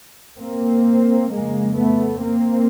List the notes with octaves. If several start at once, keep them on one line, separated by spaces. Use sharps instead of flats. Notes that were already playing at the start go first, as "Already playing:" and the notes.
A#3 C4
F2 C#3 G#3 A#3
A3 B3
A#3 C4